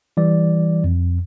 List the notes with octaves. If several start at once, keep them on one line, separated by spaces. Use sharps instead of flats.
E3 G3 D5
F2